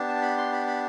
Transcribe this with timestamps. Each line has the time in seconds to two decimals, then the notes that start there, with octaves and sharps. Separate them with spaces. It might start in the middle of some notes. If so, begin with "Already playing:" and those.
Already playing: B3 D4 G4
0.08 A5
0.22 B5
0.38 C6
0.53 B5
0.67 B5